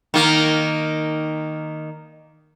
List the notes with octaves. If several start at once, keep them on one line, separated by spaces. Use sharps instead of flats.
D#3 A#3